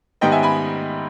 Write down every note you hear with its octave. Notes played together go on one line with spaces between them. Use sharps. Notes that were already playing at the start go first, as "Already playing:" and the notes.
G#2 D#3 G3 B3 D#5 G5
E5 G#5
G#5 B5